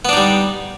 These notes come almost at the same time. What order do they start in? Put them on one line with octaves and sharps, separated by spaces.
B3 D4 D#4 G3